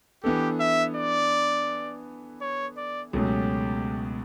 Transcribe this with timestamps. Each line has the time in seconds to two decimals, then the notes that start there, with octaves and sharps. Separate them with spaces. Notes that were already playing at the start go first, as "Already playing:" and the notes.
0.24 E3 B3 D4 G4 A4
0.60 E5
0.97 D5
2.42 C#5
2.78 D5
3.13 C#2 B2 F#3 A3 C#4 G4